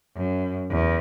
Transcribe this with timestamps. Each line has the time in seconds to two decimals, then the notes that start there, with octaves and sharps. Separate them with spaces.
0.16 F#2
0.71 E2